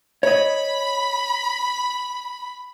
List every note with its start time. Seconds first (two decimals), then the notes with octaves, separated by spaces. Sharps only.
0.23 C#5 D#5 B5